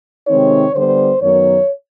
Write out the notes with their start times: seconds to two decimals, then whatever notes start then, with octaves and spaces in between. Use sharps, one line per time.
0.28 C3 D#3 G#3 C4 D#4 C#5
0.74 D3 G3 B3 C5
1.21 F#2 D#3 F#3 B3 C#5